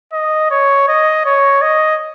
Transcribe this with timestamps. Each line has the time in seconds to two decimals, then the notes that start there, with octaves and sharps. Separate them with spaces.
0.13 D#5
0.51 C#5
0.88 D#5
1.26 C#5
1.62 D#5